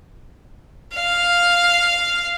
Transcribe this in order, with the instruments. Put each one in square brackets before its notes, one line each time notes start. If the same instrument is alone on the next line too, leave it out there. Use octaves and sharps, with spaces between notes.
[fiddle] F5